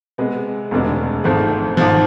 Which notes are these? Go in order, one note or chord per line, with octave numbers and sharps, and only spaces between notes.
C3 G#3 B3
E1 D2 C3 G#3 D4
G#1 G#2 F3 A3 C4
G#1 G#2 F3